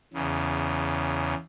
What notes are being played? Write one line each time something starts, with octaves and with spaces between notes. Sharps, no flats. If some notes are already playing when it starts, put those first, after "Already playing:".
E2 C#3